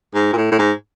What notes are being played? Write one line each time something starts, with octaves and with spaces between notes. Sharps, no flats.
G#2
A#2
A2
A2
G#2